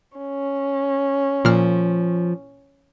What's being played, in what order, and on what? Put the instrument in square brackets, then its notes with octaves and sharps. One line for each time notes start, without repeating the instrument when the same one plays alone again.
[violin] C#4
[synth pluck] A#2 F6 [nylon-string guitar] F3